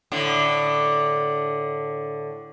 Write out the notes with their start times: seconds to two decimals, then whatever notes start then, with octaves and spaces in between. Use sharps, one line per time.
0.12 A2 D3